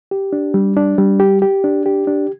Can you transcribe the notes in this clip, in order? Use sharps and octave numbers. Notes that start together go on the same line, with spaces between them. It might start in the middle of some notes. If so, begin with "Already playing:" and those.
G4
D4
G3
D4
G3
G4
G4
D4
G4
D4